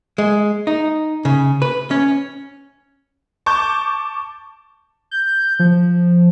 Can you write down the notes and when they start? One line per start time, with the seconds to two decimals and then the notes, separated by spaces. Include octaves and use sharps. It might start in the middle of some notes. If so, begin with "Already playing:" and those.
0.18 G#3
0.67 D#4
1.25 C#3
1.62 B4
1.91 C#4
3.46 A5 C#6 D6 G6
5.11 G6
5.59 F3